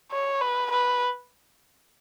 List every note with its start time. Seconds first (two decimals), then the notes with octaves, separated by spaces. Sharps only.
0.12 C#5
0.41 B4
0.71 B4